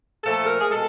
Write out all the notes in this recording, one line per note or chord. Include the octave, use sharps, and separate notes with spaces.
A#2 F3 A3 A4
A#4
G#4
B2 G#3 A4